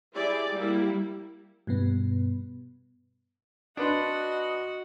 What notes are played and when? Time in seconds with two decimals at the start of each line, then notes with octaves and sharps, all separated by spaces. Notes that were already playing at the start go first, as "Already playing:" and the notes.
0.15 E4 G4 G#4 D5
0.54 G3 A#3 E4
1.67 G2 B2 B3
3.77 D4 F#4 B4 D#5 F#5 C6